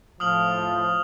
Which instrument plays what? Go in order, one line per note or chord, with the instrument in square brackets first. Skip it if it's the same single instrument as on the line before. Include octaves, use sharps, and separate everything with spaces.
[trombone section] A2 F3 [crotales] D#6 F6 F#7